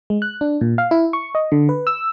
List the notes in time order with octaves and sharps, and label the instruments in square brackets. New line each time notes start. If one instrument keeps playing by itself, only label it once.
[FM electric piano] G#3
F#6
D4
A#2
F5
E4
C#6
D#5
D3
B4
E6